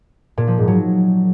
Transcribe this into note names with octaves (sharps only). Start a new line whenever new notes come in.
A#2
F3
G#2
F#3